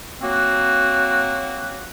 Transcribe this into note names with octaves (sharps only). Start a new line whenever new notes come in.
F#3 A#3 C4 F#4